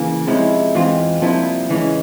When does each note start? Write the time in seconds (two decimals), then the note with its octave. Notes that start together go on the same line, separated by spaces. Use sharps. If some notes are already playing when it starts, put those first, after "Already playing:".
Already playing: C#3 E3 A#3
0.27 C3 F3 G#3 C#4 E4
0.74 E2 E3 G#3 C4 F4
1.21 C2 C3 F3 A#3 E4
1.68 E2 C#3 E3 G#3 C#4